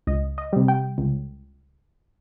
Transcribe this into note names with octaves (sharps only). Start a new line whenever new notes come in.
C#2 D#5
D#5
C3 G3
G5
C#2